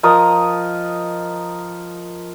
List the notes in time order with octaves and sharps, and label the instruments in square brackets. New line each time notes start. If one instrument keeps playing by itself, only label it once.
[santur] F3 A#4 D#5 D#6